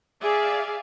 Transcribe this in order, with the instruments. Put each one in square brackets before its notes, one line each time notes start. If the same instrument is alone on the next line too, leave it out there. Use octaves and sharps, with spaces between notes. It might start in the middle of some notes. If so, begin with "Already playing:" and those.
[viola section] G#4 D5 E5 F5